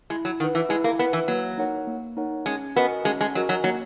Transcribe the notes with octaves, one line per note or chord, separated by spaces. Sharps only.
G#3 E4
F#3
D#3 B4 F#5
E3
G#3 E4
A#3
B3 B4 F#5
E3
F#3 A#3
D#4 A#4 C#5 F#5
A#3
D#4 A#4 C#5 F#5
G#3 C#4
B3 F#4 A#4 D#5 G#5
G#3 C#4
G#3
F#3 F#4 A#4 D#5 G#5
F#3
F#3 A#3